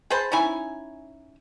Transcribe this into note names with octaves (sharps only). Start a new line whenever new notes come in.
G#4 B4 C5 A5
C#4 D#4 E4 G#5